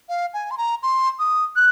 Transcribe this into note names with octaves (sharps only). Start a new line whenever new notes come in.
F5
G#5
C6
A#5
C6
D#6
F#6